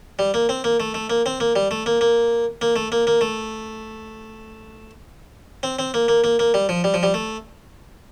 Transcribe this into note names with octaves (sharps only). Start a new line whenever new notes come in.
G3
A#3
C4
A#3
A3
A3
A#3
C4
A#3
G3
A3
A#3
A#3
A#3
A3
A#3
A#3
A3
C4
C4
A#3
A#3
A#3
A#3
G3
F3
G3
F3
G3
A3